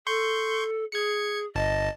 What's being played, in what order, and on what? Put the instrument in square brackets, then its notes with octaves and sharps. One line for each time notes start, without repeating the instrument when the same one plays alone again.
[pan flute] A4 [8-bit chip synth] C6 C#6 G6
[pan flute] G#4 [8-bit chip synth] G#6 C#7
[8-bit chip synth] G1 A5 [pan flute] D#5